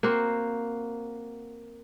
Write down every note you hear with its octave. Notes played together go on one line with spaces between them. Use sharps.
A#3 C4 F#4